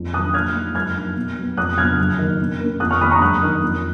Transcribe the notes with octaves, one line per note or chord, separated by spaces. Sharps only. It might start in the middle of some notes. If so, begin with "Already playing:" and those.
Already playing: F2
D#3 F#3 C#4 D#6 F#6
A#2 F6 G#6
G#3 D#4
F#2 F6 G#6
F3 A#3 D#4
B2
F#3 B3
F2 D#6 F#6
C#3 F#3 B3 F6 G#6
F#2
D#3 A#3 D#4
B2
A#3 C#4
F2 D#6 F#6
C#6 F6
D#3 G#3 B3 B5 D#6
A#5 C#6
F#2 D#6 F#6
D#3 A#3 D#4
F2